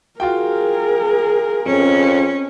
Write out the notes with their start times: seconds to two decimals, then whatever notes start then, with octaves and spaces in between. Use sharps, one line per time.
0.20 F4 F#4 G#4 A#4 G5
1.66 F2 C#4